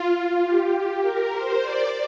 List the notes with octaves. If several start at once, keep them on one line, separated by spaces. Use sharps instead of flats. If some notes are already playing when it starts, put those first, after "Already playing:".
Already playing: F4
G4
A#4
C5
D5